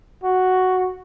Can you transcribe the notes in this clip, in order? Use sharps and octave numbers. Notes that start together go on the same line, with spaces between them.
F#4